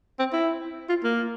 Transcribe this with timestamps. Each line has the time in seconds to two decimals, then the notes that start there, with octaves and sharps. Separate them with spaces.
0.19 C4
0.33 E4
0.89 F4
1.04 A#3